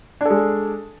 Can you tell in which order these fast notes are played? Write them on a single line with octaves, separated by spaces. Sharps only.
D4 A4 G#3